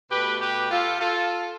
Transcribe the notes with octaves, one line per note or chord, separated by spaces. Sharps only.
B2 A3 G4 B4
G4 B4
F4 A4
F4 A4